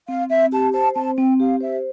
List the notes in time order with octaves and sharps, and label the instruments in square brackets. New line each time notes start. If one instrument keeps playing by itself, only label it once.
[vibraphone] C4 [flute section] F5
[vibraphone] C4 [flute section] E5
[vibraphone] G4 [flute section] A5
[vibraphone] C5 [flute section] A5
[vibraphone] C4 [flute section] A5
[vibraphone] C4 [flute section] G5
[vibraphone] G4 [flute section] F5
[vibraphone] C5 [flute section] E5